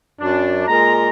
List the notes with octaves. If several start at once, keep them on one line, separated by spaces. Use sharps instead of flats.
F#2 D4
A#2 G#3 A#4 A#5